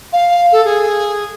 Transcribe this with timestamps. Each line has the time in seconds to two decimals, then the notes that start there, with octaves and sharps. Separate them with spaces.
0.12 F5
0.52 A4
0.64 G#4